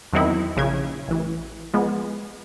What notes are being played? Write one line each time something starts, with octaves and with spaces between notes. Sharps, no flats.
E2 D#3 F#3 C4 D#4 E4
A#1 C#3 G#6
A1 E3
F3 G#3 B3